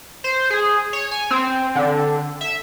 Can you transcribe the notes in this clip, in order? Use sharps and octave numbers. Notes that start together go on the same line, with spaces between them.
C5
G#4
C#5
G#5
C4
D3
E5